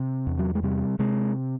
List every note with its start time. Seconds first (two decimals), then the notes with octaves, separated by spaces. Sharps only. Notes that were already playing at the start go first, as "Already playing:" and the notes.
Already playing: C3
0.27 E2
0.39 F#3
0.55 G#3
0.63 C3 G3
0.99 C3 G#3